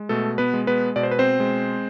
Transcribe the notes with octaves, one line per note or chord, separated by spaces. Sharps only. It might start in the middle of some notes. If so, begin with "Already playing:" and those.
Already playing: G#3
B2 A3 A4
B3 B4
G#3
B3 B4
B2 D5
C5
B4
C4 C5
G#3